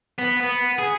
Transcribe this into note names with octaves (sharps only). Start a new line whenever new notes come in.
B3
B3
G#4